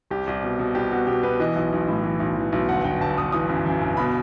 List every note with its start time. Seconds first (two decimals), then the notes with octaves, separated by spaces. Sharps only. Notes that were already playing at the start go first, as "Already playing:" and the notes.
0.11 C2 G4
0.27 C2
0.42 B2
0.59 B2
0.75 C2 G4
0.91 B2 F#4
1.07 B2 G4
1.23 B2 B4
1.40 E3 D#5
1.56 B1
1.72 B1
1.88 A2
2.03 E3
2.20 B1
2.36 E3
2.52 B1
2.69 G1 F#5
2.84 G1 G5
3.00 G1 A5
3.17 G1 D#6
3.32 E3 D#6
3.49 F#2
3.66 F#2
3.81 G1
3.97 B2 B5